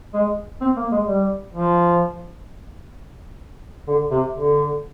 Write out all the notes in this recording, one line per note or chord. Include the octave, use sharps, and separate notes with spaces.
G#3
C4
A#3
G#3
G3
F3
D3
C3
D3